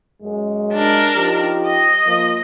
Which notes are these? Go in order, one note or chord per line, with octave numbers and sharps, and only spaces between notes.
F#2 G#3
D4 A#4
F3 D#4 G4
D#5
F3 A#3